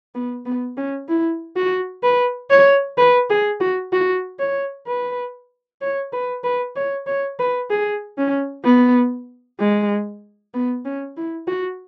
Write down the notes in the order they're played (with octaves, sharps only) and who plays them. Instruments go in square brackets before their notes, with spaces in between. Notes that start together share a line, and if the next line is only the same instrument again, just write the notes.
[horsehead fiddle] B3
B3
C#4
E4
F#4
B4
C#5
B4
G#4
F#4
F#4
C#5
B4
C#5
B4
B4
C#5
C#5
B4
G#4
C#4
B3
G#3
B3
C#4
E4
F#4